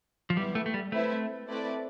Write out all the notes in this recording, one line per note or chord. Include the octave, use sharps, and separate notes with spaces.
F3
G3 B3 E4 G4
A3
A3
G3
A3 C4 E4 B4 E5
A3 C4 E4 B4 D5